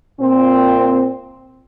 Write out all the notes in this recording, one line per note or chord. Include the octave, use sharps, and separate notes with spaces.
A#2 C4